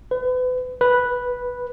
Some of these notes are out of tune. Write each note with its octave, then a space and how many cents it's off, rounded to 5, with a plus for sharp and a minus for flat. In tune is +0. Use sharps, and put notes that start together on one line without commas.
B4 +35
B4 -5